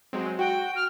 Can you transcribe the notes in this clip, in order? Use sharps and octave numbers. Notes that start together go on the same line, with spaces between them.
F#3 G#3 C4
F#4 G5
F6